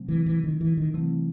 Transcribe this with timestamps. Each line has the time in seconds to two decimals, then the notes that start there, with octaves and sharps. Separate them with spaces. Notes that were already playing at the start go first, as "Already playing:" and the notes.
Already playing: C3 F#3 A3 C4
0.08 E3
0.26 E3
0.44 D#3
0.61 E3
0.77 D#3
0.94 C3 E3 F#3 A3 C4